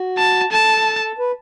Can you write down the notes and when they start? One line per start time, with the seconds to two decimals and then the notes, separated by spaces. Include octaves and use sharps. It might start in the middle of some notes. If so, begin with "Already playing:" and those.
Already playing: F#4
0.18 A5
0.52 A4 A5
1.19 B4